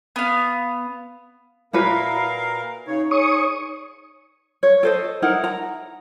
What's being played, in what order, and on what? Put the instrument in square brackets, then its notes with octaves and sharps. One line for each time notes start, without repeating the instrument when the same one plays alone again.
[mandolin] B3 F5
[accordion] A#2 A#4 F5 [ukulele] E4 F#4 B4
[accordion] C#3 C#5 [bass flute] D#4
[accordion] G#4 [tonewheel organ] C#5 C#6 D#6
[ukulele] C#5
A4 C5 D#5
D#4 E4 A#4 F#5
A#5